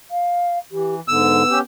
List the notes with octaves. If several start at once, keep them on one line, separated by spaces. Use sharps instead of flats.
F5
E3 G4
G#2 D3 B3 E6
C#4 G4